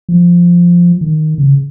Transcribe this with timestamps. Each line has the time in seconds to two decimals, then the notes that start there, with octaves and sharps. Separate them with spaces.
0.09 F3
1.01 D#3
1.38 C#3